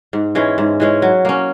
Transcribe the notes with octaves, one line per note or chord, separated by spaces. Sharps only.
G#2
E3 G#3 C#4
G#2
E3 G#3 C#4
F#3
A#3 C#4